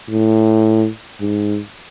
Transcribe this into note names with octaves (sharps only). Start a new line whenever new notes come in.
A2
G#2